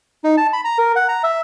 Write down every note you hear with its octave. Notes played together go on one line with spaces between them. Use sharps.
D#4
A5
B5
A#5
A#4
F#5
A#5
E5